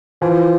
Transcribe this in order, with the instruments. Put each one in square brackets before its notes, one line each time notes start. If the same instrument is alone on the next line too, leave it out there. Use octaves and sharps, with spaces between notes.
[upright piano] E3 [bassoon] F3